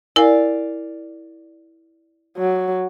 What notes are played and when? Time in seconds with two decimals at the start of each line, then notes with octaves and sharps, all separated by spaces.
0.16 E4 A#4 D5 F5 G#5
2.37 F#3